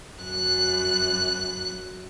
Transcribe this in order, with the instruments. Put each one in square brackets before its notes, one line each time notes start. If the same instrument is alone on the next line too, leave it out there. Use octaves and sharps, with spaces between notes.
[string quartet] F#2 F#6